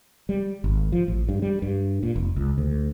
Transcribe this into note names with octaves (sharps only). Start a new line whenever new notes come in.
G3
G#1
F3
A1
G2
G3
G2
A#2
F1
C#2
D2